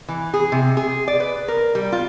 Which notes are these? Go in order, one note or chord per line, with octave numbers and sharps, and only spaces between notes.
E3
G#4
C3
G#4
D5
B4
A#4
G3
F4